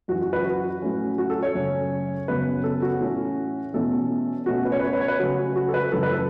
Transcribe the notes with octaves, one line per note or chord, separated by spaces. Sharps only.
F#2 E3 C#4 F#4
F#4
B4
F#4
A2 F#3 A3 C#4
F#4
A4
C#5
F#2 C#3 A3 C#4
F#2 C#3 F#3 B3 B4
A4
F#4
A2 E3 A3 C#4
E2 B2 A3 C#4 A4
B2 A3 C#4 F#4
B4
C#5
B4
C#5
B4
C#5
B4
C#3 F#3 A3 C#4 F#4
F#4
A4
B4
F#2 C#3 E3 A3 A4
B4
A4